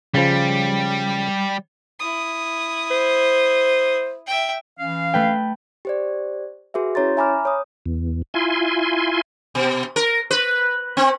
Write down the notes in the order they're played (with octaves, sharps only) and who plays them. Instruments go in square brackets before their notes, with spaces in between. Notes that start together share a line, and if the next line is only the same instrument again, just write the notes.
[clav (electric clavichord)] C#3 F3 [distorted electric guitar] G3
[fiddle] E4 D#6
[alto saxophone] C5
[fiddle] E5 G5
[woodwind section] E3 C#4 F5
[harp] A3 B4 G5
[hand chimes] G4 C5 D5
F#4 G#4 B4 E5
C#4 E4 C#5 A#5 C6 A6
E5 G#5 A#5 B5 D6 F6
C#5 D#6
[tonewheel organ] E2
E4 F4 G#5 C6
[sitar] B2
A#4
B4
C4